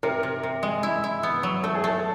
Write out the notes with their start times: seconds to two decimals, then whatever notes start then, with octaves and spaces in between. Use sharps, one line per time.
0.03 C3 A#4
0.23 C3
0.43 C3
0.63 G#3
0.83 E4
1.04 E4
1.23 B3
1.43 F#3
1.64 A3 A4
1.75 G#4
1.84 A3 A4